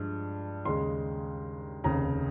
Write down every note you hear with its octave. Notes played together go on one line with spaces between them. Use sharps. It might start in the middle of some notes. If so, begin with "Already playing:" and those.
Already playing: G2 F3 G#3
D#2 C#3 G#3 C6
F1 D#2 C#3 A#5